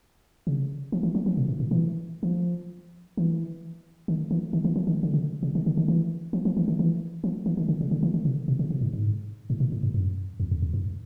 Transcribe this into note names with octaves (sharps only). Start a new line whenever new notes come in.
C#3
F3
E3
F#3
F3
B2
A#2
A#2
E3
E3
F3
E3
D#3
E3
D#3
E3
F3
D#3
D3
C#3
C#3
D#3
D3
D#3
E3
F3
F3
E3
D#3
E3
F3
E3
D#3
D3
C#3
D3
E3
D3
C3
B2
C#3
C3
G#2
G#2
A2
A#2
A2
G2
F#2
F2
E2
E2
F#2